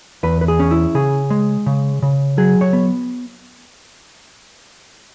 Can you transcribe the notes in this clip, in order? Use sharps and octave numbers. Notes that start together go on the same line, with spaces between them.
E2 B4
B4
G#4
C#4
E4
C#3 G#4
G#3
C#3
C#3
F#3 G#4
C#5
B3